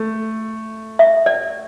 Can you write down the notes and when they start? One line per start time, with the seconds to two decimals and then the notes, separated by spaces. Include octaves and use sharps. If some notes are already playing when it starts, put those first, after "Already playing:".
Already playing: A3
0.99 E5
1.26 D5